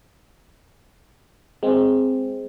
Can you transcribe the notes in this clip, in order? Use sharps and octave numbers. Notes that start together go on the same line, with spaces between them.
G#3 C4